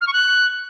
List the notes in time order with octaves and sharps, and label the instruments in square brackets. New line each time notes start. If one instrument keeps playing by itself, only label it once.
[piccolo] F6
C#6
F#6